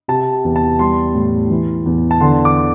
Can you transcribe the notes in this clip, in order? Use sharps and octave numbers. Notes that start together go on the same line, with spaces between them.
C3 A5
E2
A5
G3 C6
A2
E3
E2
A5
D3 C6
D6